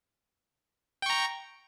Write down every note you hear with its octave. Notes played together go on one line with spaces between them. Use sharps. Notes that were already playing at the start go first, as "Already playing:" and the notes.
G5 A#5 C#6